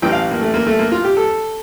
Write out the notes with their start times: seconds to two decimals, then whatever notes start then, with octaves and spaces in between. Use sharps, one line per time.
0.02 A1 A2 E3 G5
0.12 F5
0.31 A#3
0.41 A3
0.54 A#3
0.67 A3
0.79 A#3
0.92 F4
1.04 G4
1.17 A4